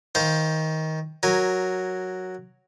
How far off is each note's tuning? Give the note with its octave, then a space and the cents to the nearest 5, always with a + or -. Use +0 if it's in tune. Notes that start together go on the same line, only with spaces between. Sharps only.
D#3 +20 C5 +0 F5 +5
F#3 +0 A#4 +0 G#5 -5